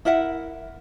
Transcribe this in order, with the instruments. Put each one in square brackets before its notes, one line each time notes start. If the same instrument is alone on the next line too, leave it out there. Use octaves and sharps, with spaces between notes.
[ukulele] E4 A#4 E5 F#5